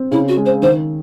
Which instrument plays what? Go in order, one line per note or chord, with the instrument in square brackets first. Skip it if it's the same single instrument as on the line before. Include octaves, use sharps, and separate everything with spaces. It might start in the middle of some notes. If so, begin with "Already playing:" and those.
Already playing: [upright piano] C4
[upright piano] C#3 [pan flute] E4
[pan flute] F#4
[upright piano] G#3
[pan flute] C5
[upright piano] D#3 [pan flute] C5